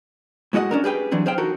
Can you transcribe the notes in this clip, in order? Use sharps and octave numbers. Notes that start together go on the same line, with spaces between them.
A2 G#3 F#4 D#5 F#5
C#4 D4 A#4
G4 G#4 B4 G5
E3 F#3 C4 D4
G#4 C5 F5 G5
D#4 F#4 A4 A#4